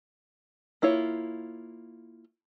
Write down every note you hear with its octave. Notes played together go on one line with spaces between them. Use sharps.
A#3 E4 F4 C#5